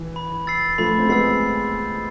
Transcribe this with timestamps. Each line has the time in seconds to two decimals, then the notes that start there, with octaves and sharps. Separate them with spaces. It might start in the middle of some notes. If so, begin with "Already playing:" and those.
Already playing: E3
0.16 B5
0.47 E6 A6 C7
0.78 F3 A3 B5
0.99 C4
1.09 G#3 B3 E6 A6 C7